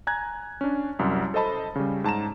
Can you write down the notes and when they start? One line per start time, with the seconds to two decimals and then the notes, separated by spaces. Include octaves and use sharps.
0.07 G#5 A#5 F#6 G#6
0.61 C#4 D4
0.99 C2 F#2
1.34 A4 C5 D#5 A5 B5
1.76 C#3 G3
2.04 G#2 A5 A#5 E7